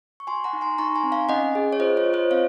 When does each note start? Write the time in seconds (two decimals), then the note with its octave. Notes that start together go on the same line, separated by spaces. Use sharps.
0.20 C#6
0.27 F#4 G#5 C6
0.44 F#5 A#5
0.53 D#4
0.61 G#5 C6
0.78 D#4 A#5 C#6
0.96 G#5 C6
1.03 C4
1.12 F5 G#5
1.29 C#4 D#5 F#5
1.55 G#4
1.72 C#5
1.80 F4 C5 D#5
1.97 C#5
2.05 F4
2.13 C5 D#5
2.31 C4 C#5 F5